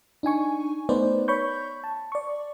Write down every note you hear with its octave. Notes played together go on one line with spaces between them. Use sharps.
D4 D#4 G#5 C#6
A3 B3 D#4 B4 C5 D5
C#5 B5 C#6 G6
A5
D5 C#6